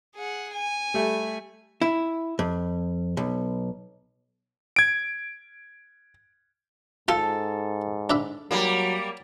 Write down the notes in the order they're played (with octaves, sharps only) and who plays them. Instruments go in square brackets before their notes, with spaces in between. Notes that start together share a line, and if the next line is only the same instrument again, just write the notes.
[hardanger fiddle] G#4 F#5
G#5
[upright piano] G3 A3
[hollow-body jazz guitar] E4
F2
B1
[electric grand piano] G#6 D7
[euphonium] G#2 [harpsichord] F4 [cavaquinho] A4
[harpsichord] D4 E5 B5
[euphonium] F#3 [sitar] G3 A#3